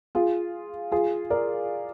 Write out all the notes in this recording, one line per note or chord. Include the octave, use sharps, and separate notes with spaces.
F4 G#4
F4 G#4
A#4 D5